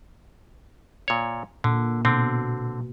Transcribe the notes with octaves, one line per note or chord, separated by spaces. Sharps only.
A#2 C#5
A#2 D3
B2 D3 C4